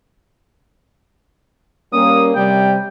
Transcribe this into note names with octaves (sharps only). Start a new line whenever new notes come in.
G3 A#3 C#4 D#6
C3 G3 G5